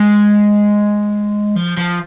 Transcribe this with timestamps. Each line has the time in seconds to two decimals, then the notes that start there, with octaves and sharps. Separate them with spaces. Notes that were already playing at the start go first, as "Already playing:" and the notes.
Already playing: G#3
1.56 F3
1.77 F3